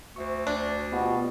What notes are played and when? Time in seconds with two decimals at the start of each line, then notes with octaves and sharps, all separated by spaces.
0.16 D2 C5 E5 C#6
0.47 D2 D4
0.92 B2 B3 F4 G4